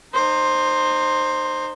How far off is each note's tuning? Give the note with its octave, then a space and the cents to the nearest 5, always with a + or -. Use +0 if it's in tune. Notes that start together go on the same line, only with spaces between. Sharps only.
D#4 -25 C5 +10